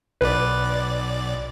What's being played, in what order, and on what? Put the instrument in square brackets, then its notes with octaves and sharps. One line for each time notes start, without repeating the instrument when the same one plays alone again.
[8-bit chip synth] B1 D5 [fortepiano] B4